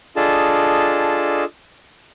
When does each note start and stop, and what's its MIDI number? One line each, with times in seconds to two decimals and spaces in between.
0.16 1.44 62
0.16 1.44 65
0.16 1.44 68
0.16 1.44 69
0.16 1.44 75
0.16 1.44 81